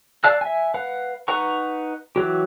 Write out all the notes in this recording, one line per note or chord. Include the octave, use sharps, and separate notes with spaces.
D5 F5 A5 E6 F#6
E5 G#5
B4 F5 F#5
D#4 B4 F#5 A#5 C#6
E3 F#3 G4